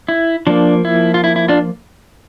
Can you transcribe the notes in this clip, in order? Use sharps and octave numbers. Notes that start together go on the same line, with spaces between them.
E4
F3 A#3 D4
E4
F4
E4
E4
D4 F4